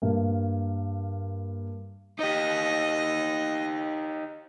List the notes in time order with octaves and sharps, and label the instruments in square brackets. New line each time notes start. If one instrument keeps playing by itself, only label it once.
[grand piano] G2 A#3
[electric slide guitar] D#4 G4 [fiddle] D#5